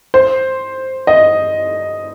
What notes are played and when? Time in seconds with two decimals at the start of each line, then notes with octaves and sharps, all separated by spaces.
0.14 C5
1.07 D#5